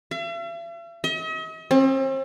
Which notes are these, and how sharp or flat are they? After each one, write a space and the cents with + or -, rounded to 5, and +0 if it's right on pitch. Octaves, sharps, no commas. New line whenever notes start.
E5 +45
D#5 +45
C4 +40